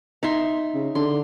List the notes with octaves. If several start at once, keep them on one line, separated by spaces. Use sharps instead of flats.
D#4 E5 C6
C#3
D3 C6